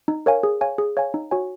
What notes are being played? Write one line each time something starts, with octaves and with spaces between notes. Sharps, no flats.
D#4
A#4 C#5 F5 G#5
G#4
C#5 F5 G#5
G#4
C#5 F5 G#5
D#4
F#4 C#5 G#5